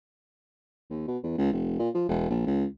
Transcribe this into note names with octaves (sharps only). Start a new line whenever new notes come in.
D#2
B2
E2
C#2
F1
A#2
F3
E1
A#1
C#2